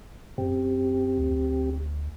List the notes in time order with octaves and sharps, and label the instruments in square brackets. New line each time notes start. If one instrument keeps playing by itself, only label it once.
[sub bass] F#2 [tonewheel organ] C4 G4
[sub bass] D2